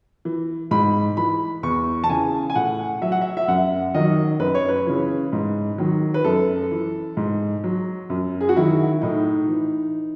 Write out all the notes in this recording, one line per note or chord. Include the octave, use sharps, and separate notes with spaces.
E3
G#2 B5
E3 B5
E2 C#6
A5
C#3 E3 G#5
G#5
A2 F#5
F#3 E5
F#5
E5
E5
F#2 F#5
D#3 F#3 D#5
F#2 B4
C#5
B4
C#3 E3
G#2
D#3 F#3
B4
F#2 A4
E3
G#2
F#3
F#2
G#4
F#4
D#3 F#3 E4
A2 D#4
E3